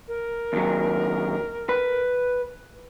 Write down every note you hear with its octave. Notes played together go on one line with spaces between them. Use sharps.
A#4
D#2 F#3
B4